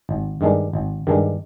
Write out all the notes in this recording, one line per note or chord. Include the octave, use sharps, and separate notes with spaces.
G#1
G2 D#3 G#3 D4
G#1
G2 D#3 G#3 D4